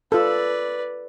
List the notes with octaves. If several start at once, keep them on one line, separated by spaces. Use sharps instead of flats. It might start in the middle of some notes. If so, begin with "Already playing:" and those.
F4 A4 B4 D5